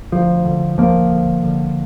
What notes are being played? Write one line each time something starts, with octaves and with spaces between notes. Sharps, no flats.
D2 F3
D3
D2 F3 A#3
D3
D3